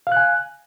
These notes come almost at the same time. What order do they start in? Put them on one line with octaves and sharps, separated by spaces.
F5 F#6 G#5